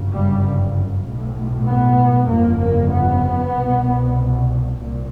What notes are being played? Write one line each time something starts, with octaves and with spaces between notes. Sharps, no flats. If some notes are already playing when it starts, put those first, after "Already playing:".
Already playing: G1 F#2 C#3
G3
B1 A2
B3
G1 F2 C#3 A#3
A#3
B3
C2 B2
C2 A#2